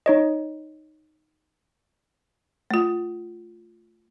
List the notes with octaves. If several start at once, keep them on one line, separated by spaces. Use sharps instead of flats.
D#4 C#5 D#5
A3 F4